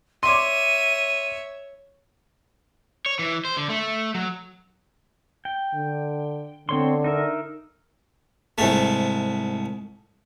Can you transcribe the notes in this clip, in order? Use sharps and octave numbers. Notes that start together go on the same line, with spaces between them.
C#5 E5 C6 D6 D#7
C#5
E3
C5
D3
A3
F#3
G5
D3
D3 C4 C#5 C6
D#4 A#4 E5
C2 G#2 A3